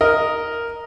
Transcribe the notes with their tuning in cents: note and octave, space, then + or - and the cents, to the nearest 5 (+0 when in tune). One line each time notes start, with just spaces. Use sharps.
A#4 +0 D#5 +0